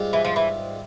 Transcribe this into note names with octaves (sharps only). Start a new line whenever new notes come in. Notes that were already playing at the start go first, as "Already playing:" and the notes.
Already playing: G#2 G3 C4 F4
E3
F3
E3